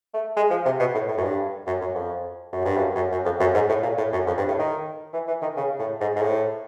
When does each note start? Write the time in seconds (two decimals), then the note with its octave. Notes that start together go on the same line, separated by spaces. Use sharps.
0.14 A3
0.37 G#3
0.51 F3
0.65 C3
0.80 B2
0.94 A2
1.08 A2
1.18 F#2
1.23 G2
1.67 F#2
1.81 F#2
1.95 F2
2.53 F#2
2.65 G2
2.77 F#2
2.96 F#2
3.12 F#2
3.25 F2
3.40 F#2
3.55 G#2
3.69 A2
3.83 A#2
3.98 A2
4.13 F#2
4.27 F2
4.38 G2
4.48 A2
4.59 D#3
5.13 E3
5.28 E3
5.42 D#3
5.57 C#3
5.79 A2
6.01 G#2
6.16 G#2
6.22 A2